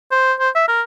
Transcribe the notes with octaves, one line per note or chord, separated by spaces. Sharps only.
C5
C5
E5
A#4